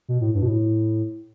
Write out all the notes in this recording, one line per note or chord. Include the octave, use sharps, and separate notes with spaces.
B2
A2
G2
B2
A2